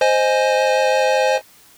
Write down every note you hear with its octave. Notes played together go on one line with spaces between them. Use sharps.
C5 D#5 G#5